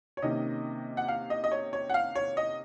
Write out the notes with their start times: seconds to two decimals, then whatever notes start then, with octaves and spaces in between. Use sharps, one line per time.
0.17 C#5
0.22 C3 D#3 A#3 C#4 D#5
0.97 F#5
1.08 F5
1.30 D#5
1.44 D#5
1.52 C#5
1.73 C#5
1.89 F#5
1.94 F5
2.15 C#5
2.37 D#5